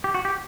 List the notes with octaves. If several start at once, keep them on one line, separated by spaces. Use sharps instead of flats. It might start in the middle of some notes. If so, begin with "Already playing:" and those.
G4
F#4
G4